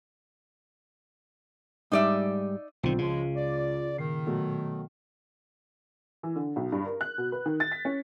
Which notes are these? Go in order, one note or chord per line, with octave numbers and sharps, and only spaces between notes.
G#2 G3 D#4 D5 E5
B1 D3 D#3 C4 F4
C#2 C#3 F3 G#3
D5
A#2 D#3 C7
B2 F#3 A3
E3
D3
B1
G2
A#4
F#6
B2
B4
D#3
A6
B6
C#4